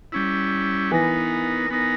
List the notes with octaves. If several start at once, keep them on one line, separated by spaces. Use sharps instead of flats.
G3 C#4 E4
E3 B3 D#4 A#4
B3 D#4 A#4